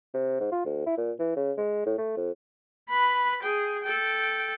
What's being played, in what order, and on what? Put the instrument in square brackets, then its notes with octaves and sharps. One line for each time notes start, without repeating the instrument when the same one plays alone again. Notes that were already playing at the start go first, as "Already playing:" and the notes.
[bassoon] C3
G#2
F4
D2
E4
A#2
E3
C#3
G#3
A2
A3
F2
[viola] B4 B5
G#4 G5
A4 G5